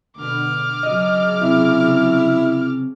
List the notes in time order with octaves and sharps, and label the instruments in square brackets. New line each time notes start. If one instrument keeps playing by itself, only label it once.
[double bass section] B2 D3 B3 [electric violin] D6 F6
[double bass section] C#3 F#3 [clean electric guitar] D#5
[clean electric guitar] C3 [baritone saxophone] E4